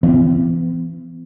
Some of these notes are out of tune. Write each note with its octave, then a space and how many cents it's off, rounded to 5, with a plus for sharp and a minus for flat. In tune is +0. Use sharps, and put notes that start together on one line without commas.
E3 +30 B3 +40